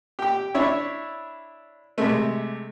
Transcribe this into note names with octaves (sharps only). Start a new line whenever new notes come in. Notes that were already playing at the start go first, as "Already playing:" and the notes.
G4 G5
D4 E4 C#5 E5
C3 G#3 A3